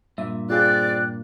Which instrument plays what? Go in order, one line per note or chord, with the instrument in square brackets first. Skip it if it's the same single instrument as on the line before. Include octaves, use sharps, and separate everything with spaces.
[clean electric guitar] G2 A#2 [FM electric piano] E5
[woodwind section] C4 D5 [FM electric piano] F4 G#4 [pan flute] F#6